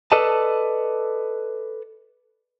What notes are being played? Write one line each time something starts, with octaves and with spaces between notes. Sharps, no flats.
A4 B4 D5 D#5 A5